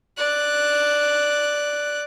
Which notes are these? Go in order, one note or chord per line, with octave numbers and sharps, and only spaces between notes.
D5 F#6